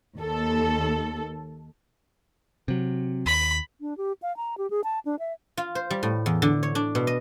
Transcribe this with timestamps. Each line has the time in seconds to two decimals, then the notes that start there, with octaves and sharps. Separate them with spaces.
0.16 D#2 A4
2.68 C3 F#3
3.26 D#2 B5
3.81 D4
3.97 G4
4.22 F5
4.37 A#5
4.58 G4
4.70 G#4
4.84 A5
5.05 D4
5.19 E5
5.57 F4
5.75 C5
5.90 G3
6.03 A2
6.26 E2
6.42 D3
6.63 C#5
6.75 D4
6.95 B2
7.07 D#5